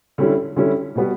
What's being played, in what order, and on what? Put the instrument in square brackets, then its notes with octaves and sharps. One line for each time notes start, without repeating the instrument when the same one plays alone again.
[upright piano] D3 G3 C#4 E4
D3 G3 C#4 E4
B2 G3 B3 F#4